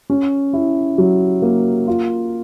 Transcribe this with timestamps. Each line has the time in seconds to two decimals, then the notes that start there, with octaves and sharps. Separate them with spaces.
0.10 C#4
0.53 E4
0.98 F#3
1.42 A#3
1.87 F4